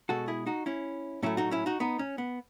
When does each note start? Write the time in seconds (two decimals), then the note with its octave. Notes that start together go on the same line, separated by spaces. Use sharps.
0.09 B2 G#3 F#4 A4
0.28 E4 G#4
0.46 D#4 F#4
0.66 C#4 E4
1.23 A2 F#3 A3 C#4 E4
1.37 D#4 F#4
1.51 C#4 E4
1.66 D#4 F#4
1.80 B3 D#4
1.99 C#4
2.18 B3